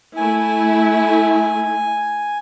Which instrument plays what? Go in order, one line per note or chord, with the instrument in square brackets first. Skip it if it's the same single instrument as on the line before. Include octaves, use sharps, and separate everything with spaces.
[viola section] A3 E4 [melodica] G#5